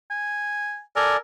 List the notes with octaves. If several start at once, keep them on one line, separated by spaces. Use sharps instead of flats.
G#5
A4 A#4 D5 G#5